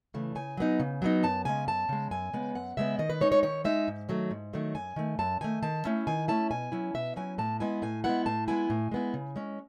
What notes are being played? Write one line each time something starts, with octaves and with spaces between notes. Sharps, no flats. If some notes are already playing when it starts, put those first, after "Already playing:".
C#3 E3 A3
C#3 G#5
F#3 B3 D#4
C#3
F#3 B3 D#4
F#2 A5
C#3 G#3 G#5
F#2 A5
C#3 G#3
F#2 G#5
C#3 G#3 B3
F#2 F#5
C#3 G#3 B3 E5
D#3 D#5
B4
G#3 D#4 C#5
C#5
D#3 C#5
G#3 D#4 E5
G#2
D#3 F#3 A3
G#2
D#3 F#3 A3
F#2 G#5
D#3 A3
F#2 A5
D#3 A3 G#5
D#3 A5
A3 C#4 E4
D#3 G#5
A3 C#4 E4 A5
B2 G#5
F#3 C#4 E4
B2 E5
F#3 C#4 E4 G#5
A2 A5
G#3 B3 E4 G#5
A2 G#5
G#3 B3 E4 F#5
A2 A5
G#3 B3 E4 G#5
A2
G#3 B3 E4
C#3
G#3 C#4